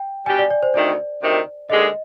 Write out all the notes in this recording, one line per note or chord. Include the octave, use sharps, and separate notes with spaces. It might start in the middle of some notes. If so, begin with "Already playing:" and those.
Already playing: G5
B2 G3 D4 G4 G#5
D5
D5
C5
D2 C3 D#3 D5
D2 C3 D#3
D#2 D3 G#3 D#5